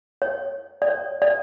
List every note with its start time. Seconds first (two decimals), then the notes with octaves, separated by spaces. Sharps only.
0.22 C#5
0.82 D5
0.89 C#5
1.22 D5